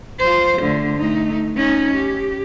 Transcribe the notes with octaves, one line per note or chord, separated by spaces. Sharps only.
F4 C5
D3 A3
A3 D#4
C#4 D#4
G4